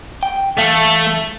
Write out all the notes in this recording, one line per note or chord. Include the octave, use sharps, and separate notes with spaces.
G5
E3 A3 F5